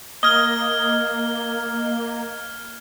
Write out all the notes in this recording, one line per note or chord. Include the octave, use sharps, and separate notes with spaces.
A#3 D#5 F6 G#6 G7